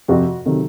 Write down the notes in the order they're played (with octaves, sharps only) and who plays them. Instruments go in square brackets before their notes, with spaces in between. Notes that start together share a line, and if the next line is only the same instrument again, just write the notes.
[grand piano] F2 C3 F3 F#4
C3 D#3 F#3 A4